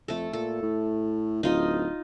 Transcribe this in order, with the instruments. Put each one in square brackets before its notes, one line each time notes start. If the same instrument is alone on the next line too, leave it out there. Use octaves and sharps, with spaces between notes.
[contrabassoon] F2 [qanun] A3 A4
[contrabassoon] A#2 [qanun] A4
[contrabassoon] A2
[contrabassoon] D1 [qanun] D#4 F4 D#5